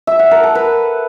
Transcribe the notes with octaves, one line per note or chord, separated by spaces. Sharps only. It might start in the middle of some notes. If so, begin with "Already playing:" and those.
E5
F#5
A#4
A4
B4